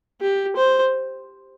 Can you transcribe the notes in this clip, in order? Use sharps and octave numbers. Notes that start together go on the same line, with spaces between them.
G4
C5